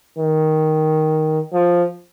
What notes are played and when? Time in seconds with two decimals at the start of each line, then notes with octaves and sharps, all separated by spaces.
0.18 D#3
1.53 F3